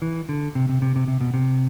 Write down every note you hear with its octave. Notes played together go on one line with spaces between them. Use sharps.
E3
D3
C3
C3
C3
C3
C3
B2
C3